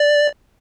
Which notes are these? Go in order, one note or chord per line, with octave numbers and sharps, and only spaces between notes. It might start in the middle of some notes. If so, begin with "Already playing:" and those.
Already playing: D5